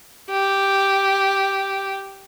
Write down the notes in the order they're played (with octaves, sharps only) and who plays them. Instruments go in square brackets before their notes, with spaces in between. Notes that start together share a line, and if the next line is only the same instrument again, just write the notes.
[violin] G4